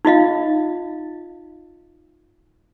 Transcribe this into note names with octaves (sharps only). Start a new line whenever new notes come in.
D#4 F4 D#5 F5